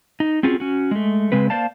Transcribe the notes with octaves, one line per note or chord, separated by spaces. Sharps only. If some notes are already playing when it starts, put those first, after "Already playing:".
D#4
C4 C#4 F4 F#4 G#4
C#4 F#4
G#3 A3
C#3 G#3 C4 B4
A#3 C5 D5 F5 A5